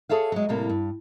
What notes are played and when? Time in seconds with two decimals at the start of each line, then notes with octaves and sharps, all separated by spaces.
0.09 G#4 A4 C#5 E5 F5
0.32 F#3 G#3
0.49 A2 C3 G3 A#3
0.70 G2